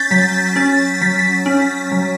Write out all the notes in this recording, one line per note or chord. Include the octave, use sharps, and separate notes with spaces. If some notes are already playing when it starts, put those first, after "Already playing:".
Already playing: C#4 G6 A6 B6
F#3 B6
C#4 A6
F#3 B6
B6
C#4
F#3